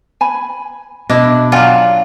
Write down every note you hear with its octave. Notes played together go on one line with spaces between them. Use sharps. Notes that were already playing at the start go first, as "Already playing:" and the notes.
G#5 B5
B2 D4 E4 D#5
F#3 F4 D5 F#5 G#5